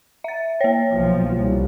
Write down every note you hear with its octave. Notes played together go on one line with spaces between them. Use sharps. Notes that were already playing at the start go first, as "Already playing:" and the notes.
E5 A6
A#3 C#5
B1 F3
C2